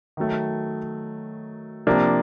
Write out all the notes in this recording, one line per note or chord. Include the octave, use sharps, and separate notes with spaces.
D#3 F#3 A3
C3 F3 A#3 D4